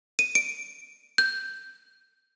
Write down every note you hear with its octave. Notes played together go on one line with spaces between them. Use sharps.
D#7
D7
G6